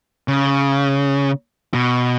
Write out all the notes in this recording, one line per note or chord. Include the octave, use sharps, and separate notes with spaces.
C#3
B2